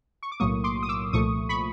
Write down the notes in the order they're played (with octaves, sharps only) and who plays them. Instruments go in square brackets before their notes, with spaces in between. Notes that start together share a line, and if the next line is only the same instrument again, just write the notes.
[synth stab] C#6
D6
B1 A2 F#3 A#3 C#6 D#6
C6 D6
D#6
D6 E6
C2 A#2 F3 A3 C#6 D#6
B5 C#6